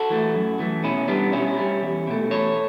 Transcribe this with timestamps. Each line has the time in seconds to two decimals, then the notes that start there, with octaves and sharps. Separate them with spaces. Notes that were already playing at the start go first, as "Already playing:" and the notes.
Already playing: F#4 A4
0.10 E3 A3
0.35 F#2
0.59 E3 A3
0.83 B2 C#4 E4
1.08 G3 B3 D4
1.32 B2 C#4 E4
1.58 G3
1.82 E2
2.07 B2 A3
2.31 E2 A4 C#5